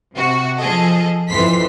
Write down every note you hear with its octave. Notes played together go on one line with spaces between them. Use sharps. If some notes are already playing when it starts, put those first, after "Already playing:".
C3 F#4
F3 G#4 A4 D#5
F2 E3 C6 B6